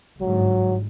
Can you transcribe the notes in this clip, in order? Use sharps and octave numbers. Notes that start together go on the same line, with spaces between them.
G1 G#2 F#3